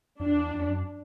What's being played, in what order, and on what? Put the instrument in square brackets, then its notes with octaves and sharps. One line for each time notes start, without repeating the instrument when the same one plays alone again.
[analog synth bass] F2 [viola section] D4
[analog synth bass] E2
F2
F#2